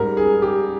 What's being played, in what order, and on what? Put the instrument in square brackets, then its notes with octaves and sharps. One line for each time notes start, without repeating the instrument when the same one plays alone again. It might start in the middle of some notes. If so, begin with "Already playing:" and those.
Already playing: [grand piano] G#2 G3 A#4
G#4
G4